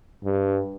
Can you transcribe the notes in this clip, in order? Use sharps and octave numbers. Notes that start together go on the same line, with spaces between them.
G2